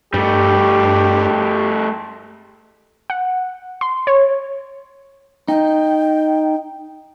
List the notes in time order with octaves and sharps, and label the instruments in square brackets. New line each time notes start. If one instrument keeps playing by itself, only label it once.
[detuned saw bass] G2 [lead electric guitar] G3 A3 [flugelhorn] G4
[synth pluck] F#5
C6
C#5
[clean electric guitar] D#4 [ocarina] G5